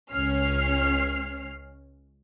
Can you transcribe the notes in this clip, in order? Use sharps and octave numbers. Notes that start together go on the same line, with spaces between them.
C#2 C#4 F6 C7